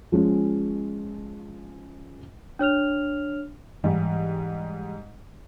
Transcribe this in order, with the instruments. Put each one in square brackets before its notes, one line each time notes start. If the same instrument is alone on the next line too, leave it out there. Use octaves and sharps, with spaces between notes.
[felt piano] F3 G#3 C#4
[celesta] D4 C#5 F6 F7
[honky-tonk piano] G#2 G3 [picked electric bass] E3